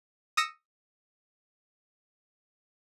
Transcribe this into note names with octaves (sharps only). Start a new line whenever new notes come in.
D#6 E6 A#6 C#7 E7